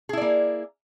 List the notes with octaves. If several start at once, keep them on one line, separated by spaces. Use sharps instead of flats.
A#3 E4 G#4 D5